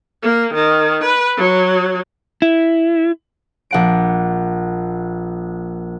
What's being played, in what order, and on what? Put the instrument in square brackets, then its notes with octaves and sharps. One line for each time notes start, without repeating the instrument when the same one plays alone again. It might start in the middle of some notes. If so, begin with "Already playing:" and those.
[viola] A#3
D#3
B4
F#3
[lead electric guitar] E4
[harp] A#1 F#5 D7